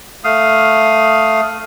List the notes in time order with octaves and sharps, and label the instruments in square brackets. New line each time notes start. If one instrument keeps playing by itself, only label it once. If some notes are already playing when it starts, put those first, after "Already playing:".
[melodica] A3 F5 D#6